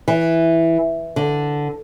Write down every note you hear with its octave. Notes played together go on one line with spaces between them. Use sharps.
E3
D3